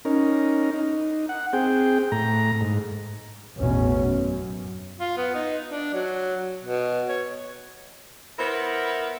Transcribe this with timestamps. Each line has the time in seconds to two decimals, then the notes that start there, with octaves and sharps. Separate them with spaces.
0.05 C#4 D#4 A#4
0.74 D#4
1.29 F#5
1.53 C4 G#4 G5
2.12 A2 A#5
2.61 G#2
3.57 A1 E2 B2 C#4
4.04 F#2
5.00 F4
5.17 B3
5.35 D#4
5.70 D4
5.93 F#3
6.62 B2
7.08 C#5
8.38 B3 E4 A#4 C5